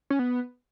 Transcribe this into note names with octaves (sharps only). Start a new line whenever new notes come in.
C#4
B3